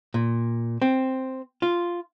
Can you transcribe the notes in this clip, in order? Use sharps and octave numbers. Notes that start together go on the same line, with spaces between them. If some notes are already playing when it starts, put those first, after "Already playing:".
A#2
C4
F4